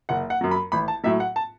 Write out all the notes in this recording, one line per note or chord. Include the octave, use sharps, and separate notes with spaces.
F#1 F#5
F#5
F#2 F#3
B5
A1 B5
A5
A2 F#3 E5
F#5
A5